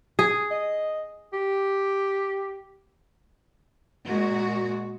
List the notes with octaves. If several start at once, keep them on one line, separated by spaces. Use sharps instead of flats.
G#4
D#5
G4
A#2 G#3 F#4